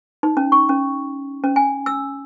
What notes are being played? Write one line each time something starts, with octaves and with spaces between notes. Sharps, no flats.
D#4
C#4
C#6
C#4
C#4
G#5
E6